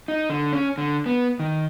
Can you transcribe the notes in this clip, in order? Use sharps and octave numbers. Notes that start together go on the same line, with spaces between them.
D#4
D3
C#4
D3
B3
D#3